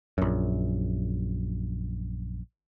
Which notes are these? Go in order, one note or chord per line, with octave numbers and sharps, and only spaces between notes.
A#1 F#2